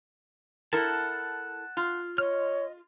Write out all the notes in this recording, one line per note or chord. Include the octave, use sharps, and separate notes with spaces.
E4 A4 A#4 F#5 A5
F4
C#5 D#5 F6